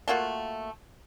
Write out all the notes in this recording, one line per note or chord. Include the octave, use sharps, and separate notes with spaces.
A3 A#3 F4 F#4